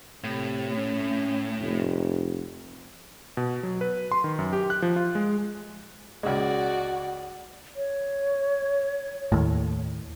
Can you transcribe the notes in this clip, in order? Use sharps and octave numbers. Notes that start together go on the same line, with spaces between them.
A2 C3
C#4
F1
B2
F#3
B4
C6
D#3
F#2
G4
F#6
F3
F4
G#3
C#2 G#3 F#4 D5
C#5
D#2 A2